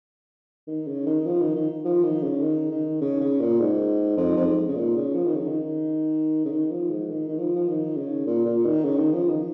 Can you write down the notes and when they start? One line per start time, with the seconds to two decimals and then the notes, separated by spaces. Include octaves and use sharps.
0.67 D#3
0.87 C#3
1.06 D#3
1.26 F3
1.41 D#3
1.56 D#3
1.85 F3
2.04 D#3
2.23 C#3
2.43 D#3
2.71 D#3
3.01 C#3
3.20 C#3
3.40 A#2
3.60 G#2
4.17 F2
4.37 F2
4.47 G#2
4.69 C#3
4.76 A#2
4.96 C#3
5.15 F3
5.26 D#3
5.36 C#3
5.47 D#3
6.45 C#3
6.51 D#3
6.71 F3
6.90 G#2
7.10 D#3
7.28 D#3
7.38 F3
7.56 F3
7.68 D#3
7.97 C#3
8.26 A#2
8.46 A#2
8.65 D#3
8.85 C#3
8.99 D#3
9.13 F3
9.29 D#3